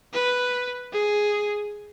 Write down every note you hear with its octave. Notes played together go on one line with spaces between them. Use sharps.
B4
G#4